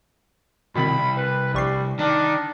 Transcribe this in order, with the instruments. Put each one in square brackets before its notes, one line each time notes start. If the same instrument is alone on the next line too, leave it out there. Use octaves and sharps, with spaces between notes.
[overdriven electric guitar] C2 [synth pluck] B2 D#3 C4 [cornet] B5
[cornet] B4
[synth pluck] A#1 C#6 C7 [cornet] G3
[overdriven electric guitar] D#3 [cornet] D4